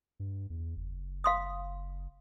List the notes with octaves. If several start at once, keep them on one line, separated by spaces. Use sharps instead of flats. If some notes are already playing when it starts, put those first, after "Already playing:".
G2
E2
F#1
F5 C6 D#6